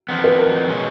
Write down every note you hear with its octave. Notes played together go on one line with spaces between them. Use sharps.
F2 F3 B3
B4
A#4
B2 G#3 C#4